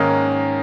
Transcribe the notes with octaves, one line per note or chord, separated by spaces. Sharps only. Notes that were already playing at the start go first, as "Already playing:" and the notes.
Already playing: G#2 D#3 A#3 C#4